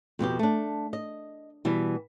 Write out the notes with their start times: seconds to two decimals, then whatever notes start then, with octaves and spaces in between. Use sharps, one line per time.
0.19 F2 B2 F#4 G4
0.39 A3 D4
0.93 D#5
1.65 B2 E3 G3